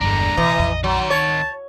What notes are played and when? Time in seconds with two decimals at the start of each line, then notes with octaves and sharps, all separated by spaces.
0.01 G1 E2 G#3 D4 A#5
0.37 A#1 C3 E3 D#5
0.59 A#1 F2
0.84 D#3 F#3 C6
1.10 C#2 C#5 A5